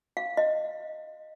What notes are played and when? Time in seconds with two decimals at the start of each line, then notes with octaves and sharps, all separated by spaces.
0.17 F5
0.37 D#5